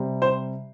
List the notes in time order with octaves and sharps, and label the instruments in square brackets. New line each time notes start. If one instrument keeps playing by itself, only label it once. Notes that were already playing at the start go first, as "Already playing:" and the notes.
Already playing: [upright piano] C3 G3
C5